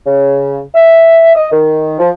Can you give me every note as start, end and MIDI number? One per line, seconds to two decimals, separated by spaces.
0.06 0.59 49
0.75 1.33 76
1.35 1.47 75
1.52 1.96 51
1.99 2.09 53